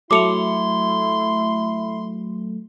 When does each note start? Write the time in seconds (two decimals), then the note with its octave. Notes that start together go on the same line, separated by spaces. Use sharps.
0.11 F#3 A3 E4 C6 D6 C#7 F7